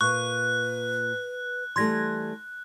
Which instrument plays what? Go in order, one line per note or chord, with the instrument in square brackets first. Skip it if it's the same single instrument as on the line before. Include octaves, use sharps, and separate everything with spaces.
[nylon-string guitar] A#2 [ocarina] B4 [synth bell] C#6 [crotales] F#6
[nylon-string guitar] E3 G3 A3 [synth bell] C6 G#6 A#6